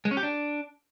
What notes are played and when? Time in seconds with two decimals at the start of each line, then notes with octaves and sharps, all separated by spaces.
0.05 G#3
0.11 C#4
0.17 G4
0.23 D4